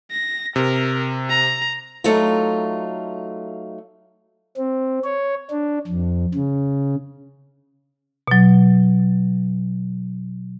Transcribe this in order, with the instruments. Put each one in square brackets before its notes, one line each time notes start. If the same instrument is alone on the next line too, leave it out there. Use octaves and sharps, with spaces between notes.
[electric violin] A#6
[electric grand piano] C3 [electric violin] A#4
[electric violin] A#5
[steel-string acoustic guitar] F#3 A3 D#4 F4
[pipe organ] C4
C#5
D4
F2
C#3
[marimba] B2 F#3